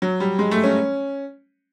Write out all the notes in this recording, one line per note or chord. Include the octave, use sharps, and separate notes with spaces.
F#3
G3
G#3
A3
C#4